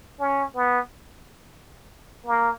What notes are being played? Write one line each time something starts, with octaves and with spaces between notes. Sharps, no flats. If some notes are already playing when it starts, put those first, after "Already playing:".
C#4
B3
A#3